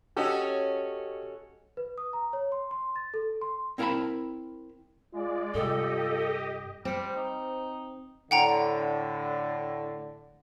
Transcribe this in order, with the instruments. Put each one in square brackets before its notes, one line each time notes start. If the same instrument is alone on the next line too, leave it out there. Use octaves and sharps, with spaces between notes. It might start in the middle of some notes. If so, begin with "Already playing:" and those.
[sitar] C#4 F#4 A4 [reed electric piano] G4 D#5
[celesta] B4
D#6
A#5
C#5
C6
C6
A6
A4
C6
[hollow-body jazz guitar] C4 E4 A#4 F#5 A5 B5
[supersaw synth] G#3 D5 [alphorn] F4
[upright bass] G2 C3 [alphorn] F4 [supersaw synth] G4 D#5 [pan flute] A4
[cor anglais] G3 [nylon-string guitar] C4 [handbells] C5 C#7
[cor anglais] D#4
[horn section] A2 D3 [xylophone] F#5 G5 A#5